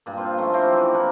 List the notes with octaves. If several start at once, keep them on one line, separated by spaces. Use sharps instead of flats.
G2 A#2
C4 F4
D#3 F3 A3 C#4
C4 E4 F4 G4
E3 F#4
A#3 D4 F#5